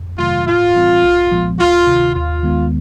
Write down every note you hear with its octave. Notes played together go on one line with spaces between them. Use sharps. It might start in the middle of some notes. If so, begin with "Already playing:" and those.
Already playing: F2
C3 D#3 F#3 A3 F4
A2 F4
E3 G3 C4
B1
A#2 F3 G#3 B3
D2 F4
C3 D#3
D#2 F4
D#3 G#3 B3